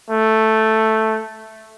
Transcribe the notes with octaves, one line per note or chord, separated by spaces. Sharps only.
A3